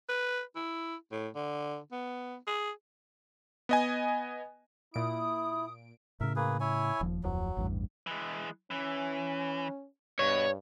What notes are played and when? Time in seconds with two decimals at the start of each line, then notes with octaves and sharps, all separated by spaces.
0.09 B4
0.56 E4
1.12 A2
1.35 D3
1.92 B3
2.47 G#4
3.69 B3 D#5 G#5
4.94 A#2 E4 D#6 D7
6.21 A2 C#3 A#4 E5
6.36 A#3 G#4 B4
6.60 E4 C#5 G#5
7.01 D#1 F3
7.24 D1 F2 F#3
7.57 A1 E2 G2
8.07 E3 G#3
8.71 E3 C#4
10.19 G2 B2 C#5